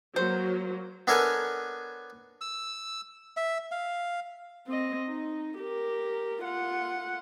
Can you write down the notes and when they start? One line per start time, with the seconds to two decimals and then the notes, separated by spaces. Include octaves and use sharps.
0.16 F#3 A#3 C5
1.07 B3 D4 A4 A#4 C#5 G#5
2.41 E6
3.37 E5
3.72 F5
4.67 C4 D#5
5.08 D#4
5.58 G4 A#4
6.44 F4 F#5